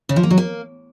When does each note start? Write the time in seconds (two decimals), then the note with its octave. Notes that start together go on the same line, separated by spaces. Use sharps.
0.09 C#3
0.16 F3
0.23 A#3
0.30 F#3
0.38 A#3